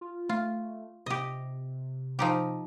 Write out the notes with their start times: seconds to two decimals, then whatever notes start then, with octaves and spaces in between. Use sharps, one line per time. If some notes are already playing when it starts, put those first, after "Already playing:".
0.01 F4
0.29 A3 F4
1.06 C3 G4 D#5
2.19 F3 D#4 G4